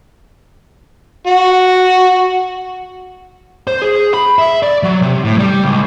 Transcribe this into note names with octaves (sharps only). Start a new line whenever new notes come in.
F#4
C5
G#4
B5
E5
D5
F#3
C3
A2
G3
C#2